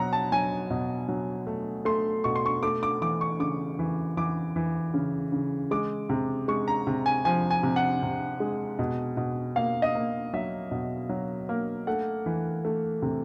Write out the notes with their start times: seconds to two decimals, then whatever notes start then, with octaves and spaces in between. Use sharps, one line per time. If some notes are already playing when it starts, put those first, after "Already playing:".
Already playing: B2 F#3 F#5 A#5
0.13 A5
0.32 F#3 G#5
0.70 B2
1.09 F#3
1.47 A3
1.85 A3 C6
2.24 B2 C#6
2.36 C6
2.46 C#6
2.63 A3 D6
2.83 D6
3.01 E3 D6
3.21 C#6
3.40 C#3 D6
3.79 E3
4.17 E3 D6
4.56 E3
4.94 C#3
5.32 C#3
5.71 G#3 D6
6.09 C3
6.48 G#3 C#6
6.68 A#5
6.87 C3
7.06 G#5
7.25 F3 G#5
7.50 G#5
7.63 C3
7.76 F#5
8.03 C3
8.40 G#3
8.79 B2
9.17 B2
9.56 A#3 F5
9.82 D#5
9.95 A#3
10.34 F#3 E5
10.71 B2
11.10 F#3
11.49 A#3
11.87 A3 F#5
12.26 E3
12.65 A3
13.02 C3